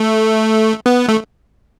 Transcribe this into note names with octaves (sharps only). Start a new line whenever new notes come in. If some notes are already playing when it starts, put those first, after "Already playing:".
Already playing: A3
B3
A3